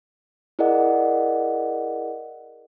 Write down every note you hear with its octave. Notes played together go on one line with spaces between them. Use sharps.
E4 G#4 A#4 D5 D#5 F#5